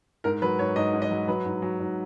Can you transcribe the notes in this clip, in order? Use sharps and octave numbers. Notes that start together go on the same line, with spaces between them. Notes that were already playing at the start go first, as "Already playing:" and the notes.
G#2 A#4
F#3 B4
G#2 C#5
G#2 D#5
G#2
D#5
F#3
F#3 B4
G#2
F#3
G#2